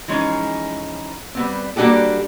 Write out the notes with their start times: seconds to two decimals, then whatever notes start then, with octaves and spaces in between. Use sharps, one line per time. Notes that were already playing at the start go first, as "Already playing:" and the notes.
0.08 E3 F3 G#3 C#4 D#4
1.35 G3 B3 C4
1.76 G3 A#3 D4 F#4 G4 A4